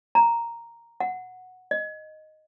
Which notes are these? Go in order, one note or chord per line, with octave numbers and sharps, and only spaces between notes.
A#5
F#5
D#5